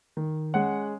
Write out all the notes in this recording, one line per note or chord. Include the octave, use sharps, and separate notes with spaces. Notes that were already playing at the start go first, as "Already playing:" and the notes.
D#3
G#3 C#4 F#5